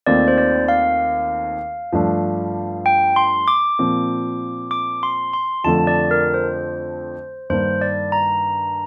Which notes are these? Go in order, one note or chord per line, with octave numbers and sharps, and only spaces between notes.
D#2 D#3 A3 C4 F4 D5
C5
D5
F5
G2 F3 A3 D4
G5
C6
D6
A#2 F3 C4
D6
C6
C6
F2 D3 F3 A3 A5
D5
A#4
C5
G2 D#3 A#3 D4 C5
D5
A#5